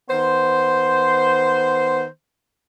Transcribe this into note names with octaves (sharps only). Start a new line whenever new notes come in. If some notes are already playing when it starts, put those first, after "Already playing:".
D#3 B3 C5